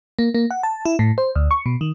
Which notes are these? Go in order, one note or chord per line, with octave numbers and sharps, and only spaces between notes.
A#3
A#3
F#5
A5
E4
A2
C5
D2
C#6
B2
D#3